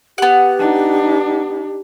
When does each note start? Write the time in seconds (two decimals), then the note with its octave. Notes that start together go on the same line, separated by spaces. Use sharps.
0.18 B3 G4 F#5
0.59 D4 D#4